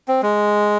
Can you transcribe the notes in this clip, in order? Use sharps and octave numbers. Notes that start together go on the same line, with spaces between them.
C4
G#3